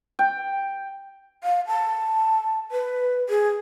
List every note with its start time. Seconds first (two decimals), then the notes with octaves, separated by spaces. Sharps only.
0.19 G5
1.44 F5
1.67 A5
2.72 B4
3.29 G#4